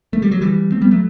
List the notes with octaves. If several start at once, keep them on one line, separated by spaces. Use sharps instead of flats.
A3
G3
F#3
E3 G3
A3 C4
G3 B3
F#3 A3